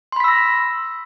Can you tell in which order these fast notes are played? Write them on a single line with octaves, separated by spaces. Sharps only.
C6 B5 B6 E6 A#6